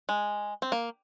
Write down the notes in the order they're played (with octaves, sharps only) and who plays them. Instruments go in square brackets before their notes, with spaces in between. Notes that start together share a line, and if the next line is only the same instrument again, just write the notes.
[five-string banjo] G#3
C4
A#3